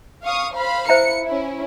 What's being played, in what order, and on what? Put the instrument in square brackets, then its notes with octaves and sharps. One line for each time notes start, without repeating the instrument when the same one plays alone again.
[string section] F5 C#6 D#6
C5 F5 B5
[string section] E4 C#7 [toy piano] C5 E5 A#5
[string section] C#4 E4